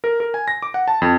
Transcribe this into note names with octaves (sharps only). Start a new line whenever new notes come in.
A#4
A#4
G#5
A#6
D6
F#5
A5
F2